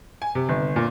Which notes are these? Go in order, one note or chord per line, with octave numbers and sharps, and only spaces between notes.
G#5
C3
G1
A#2